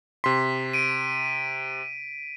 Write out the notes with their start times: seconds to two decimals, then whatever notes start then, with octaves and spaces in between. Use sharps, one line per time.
0.24 C3 C6 B6
0.73 D7 D#7